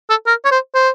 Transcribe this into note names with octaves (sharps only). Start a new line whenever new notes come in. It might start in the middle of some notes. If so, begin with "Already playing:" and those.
A4
A#4
C#5
C5
C5